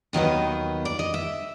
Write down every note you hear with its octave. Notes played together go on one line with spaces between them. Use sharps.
D#2 D#3 F#3 B3 D#5
D5
D#5
E5